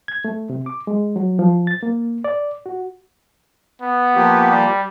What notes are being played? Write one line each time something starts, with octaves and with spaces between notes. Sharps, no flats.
G#6
A3
C3
D6
G#3
F#3
F3
A6
A#3
D5
F#4
B3
F3 A#3 G4
G3